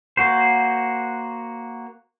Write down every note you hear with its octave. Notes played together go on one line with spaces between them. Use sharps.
A#3 F#4 C5